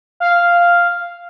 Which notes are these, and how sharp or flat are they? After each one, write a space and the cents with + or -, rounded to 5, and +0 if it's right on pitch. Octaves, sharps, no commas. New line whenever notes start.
F5 -5